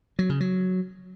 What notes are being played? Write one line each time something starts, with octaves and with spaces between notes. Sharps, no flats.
F#3
C#3
F#3